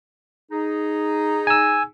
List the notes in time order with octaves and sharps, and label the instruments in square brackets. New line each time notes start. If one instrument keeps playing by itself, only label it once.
[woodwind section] D#4 G#4
[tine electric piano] G#5 E6